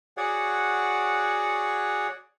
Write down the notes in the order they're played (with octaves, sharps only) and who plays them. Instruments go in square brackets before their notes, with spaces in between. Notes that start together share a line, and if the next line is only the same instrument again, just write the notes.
[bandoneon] F#4 G#4 C#5 D5 F#5